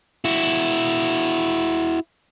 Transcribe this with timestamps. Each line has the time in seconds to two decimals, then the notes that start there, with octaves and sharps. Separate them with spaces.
0.25 E4 F#4